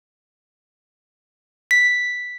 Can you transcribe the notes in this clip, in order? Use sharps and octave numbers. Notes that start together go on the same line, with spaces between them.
B6